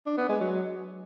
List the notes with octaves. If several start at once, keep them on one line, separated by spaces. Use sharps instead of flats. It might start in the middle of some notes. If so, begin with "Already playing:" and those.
D4
B3
G#3
F#3